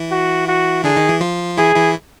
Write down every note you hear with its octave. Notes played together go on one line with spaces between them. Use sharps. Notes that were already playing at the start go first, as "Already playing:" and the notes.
Already playing: E3 E4
F#4
F#4
D3 D4 G#4
D#3 D#4
E3 E4
F3 F4
E3 E4 G#4
E3 E4